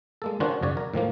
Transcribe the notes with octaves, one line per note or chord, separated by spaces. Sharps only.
G#3 A#3 A4
D#3 C#4 D4 F4 F#4 C5
F#2 C#3 F#4 C#5 D5
A#4
A2 D#3 F3 A#3